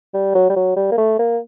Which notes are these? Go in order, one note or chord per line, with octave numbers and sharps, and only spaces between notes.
G3
F#3
G3
F#3
G3
A#3
A3
A#3